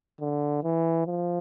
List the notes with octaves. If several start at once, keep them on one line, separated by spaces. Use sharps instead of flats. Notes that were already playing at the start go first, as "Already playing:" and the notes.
D3
E3
F3